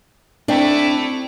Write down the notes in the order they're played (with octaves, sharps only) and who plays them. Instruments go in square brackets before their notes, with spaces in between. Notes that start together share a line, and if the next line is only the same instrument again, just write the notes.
[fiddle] A3 E4 [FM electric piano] C4 G5 [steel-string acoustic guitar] D4